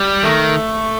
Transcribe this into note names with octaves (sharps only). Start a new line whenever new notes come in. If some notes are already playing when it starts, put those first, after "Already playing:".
Already playing: G3
D#3 A3